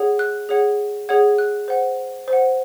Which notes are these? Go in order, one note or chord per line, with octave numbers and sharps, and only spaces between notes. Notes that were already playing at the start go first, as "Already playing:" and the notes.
Already playing: G#4 C#5 F#5
F#6
G#4 C#5 F#5
G#4 C#5 F#5 G#6
F#6
C5 F#5
C5
F#5